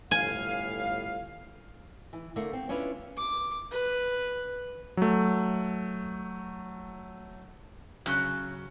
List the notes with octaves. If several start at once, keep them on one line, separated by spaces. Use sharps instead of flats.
G1 A2 F5 G#5
E3
D3 A3 A#3
C4
C#4 D4 E4 F4 B4 C#5
D6
B4
F#3 A3
C#3 F#3 C#4 F#6